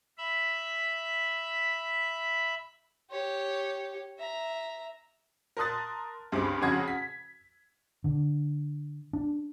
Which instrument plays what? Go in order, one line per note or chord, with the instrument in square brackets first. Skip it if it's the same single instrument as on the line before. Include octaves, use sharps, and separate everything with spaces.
[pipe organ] E5 B5
[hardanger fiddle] G4 C#5
E5 A#5
[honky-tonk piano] A#4 A5 C6 D#6 F#6 A6
C#2 G2 C4 G#4 D6
F2 C#3 F#4 G#6
B6
[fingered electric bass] D3
D4